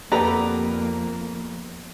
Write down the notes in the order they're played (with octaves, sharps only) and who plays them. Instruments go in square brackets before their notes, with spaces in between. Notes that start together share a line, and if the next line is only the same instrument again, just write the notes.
[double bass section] F2 A#3 [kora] B3 G4 A4 [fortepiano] B4 D5 A#5